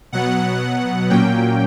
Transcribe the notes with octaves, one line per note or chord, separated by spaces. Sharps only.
B2 F#3 B3 F#5
A#2 F#3 A#3 C#4 G5